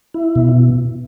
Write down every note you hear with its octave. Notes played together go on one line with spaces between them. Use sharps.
E4
B2